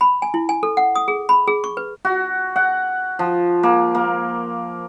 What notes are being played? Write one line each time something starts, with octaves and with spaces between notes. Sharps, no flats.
B5
G#5
E4
G#5
A4
F#5
D#6
G#4
B5
G#4
C#6
B4
F#4
F#5
F3
A#3
A#3